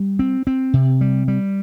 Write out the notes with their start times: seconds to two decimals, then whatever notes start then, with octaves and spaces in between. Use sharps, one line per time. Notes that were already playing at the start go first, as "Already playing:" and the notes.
Already playing: G3
0.19 C4
0.47 C4
0.74 C3
1.01 G3
1.28 G3